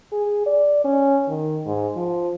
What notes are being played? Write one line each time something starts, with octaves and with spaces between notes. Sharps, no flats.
G#4
D5
C#4
D#3
G#2
F3